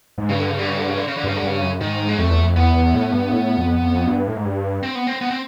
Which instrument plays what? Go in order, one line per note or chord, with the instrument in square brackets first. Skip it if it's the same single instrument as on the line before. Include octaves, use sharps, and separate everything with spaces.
[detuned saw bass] G#2
[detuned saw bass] G2 [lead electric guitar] C#3
[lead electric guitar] D3
C#3
D3
C#3
D3
C#3
D3
C#3
D3
[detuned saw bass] G2 [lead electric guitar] C#3
[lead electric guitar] D3
[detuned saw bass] G2 [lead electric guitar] C#3
[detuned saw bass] F#2
[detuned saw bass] G#2 [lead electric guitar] D#3
[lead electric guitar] G#3
[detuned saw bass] F2 [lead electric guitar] A3
[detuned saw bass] E2
F2
[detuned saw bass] E2 [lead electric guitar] B3
[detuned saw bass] E2
A2
G2
A2
F2
F2
G2
A2
G#2
G2
[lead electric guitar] C4
B3
C4
B3
C4